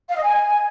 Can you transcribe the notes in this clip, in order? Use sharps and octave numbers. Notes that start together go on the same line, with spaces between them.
F5
D#5
G#5